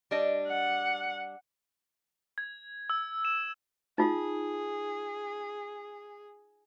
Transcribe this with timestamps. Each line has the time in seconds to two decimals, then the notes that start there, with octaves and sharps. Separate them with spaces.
0.11 G3 D4 D#5
0.48 F#5
2.38 G#6
2.90 E6
3.25 E7
3.98 D#4 F4 G#4